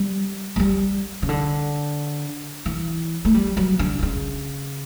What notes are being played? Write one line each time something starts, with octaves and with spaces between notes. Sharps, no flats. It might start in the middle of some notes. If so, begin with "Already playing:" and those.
Already playing: G3
A3
G3
C#3
D3
E3
A3
G3
F#3
D3
D3
C#3